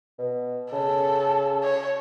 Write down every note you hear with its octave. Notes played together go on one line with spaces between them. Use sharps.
B2
C#3 A4
C#5